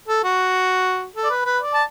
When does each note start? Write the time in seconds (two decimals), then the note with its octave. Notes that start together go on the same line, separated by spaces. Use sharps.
0.09 A4
0.24 F#4
1.16 A4
1.24 D5
1.30 B4
1.45 B4
1.61 D5
1.74 A5